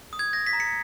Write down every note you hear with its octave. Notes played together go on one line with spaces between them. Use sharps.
D#6
G#6
G6 A#6
B6
A#5
C#7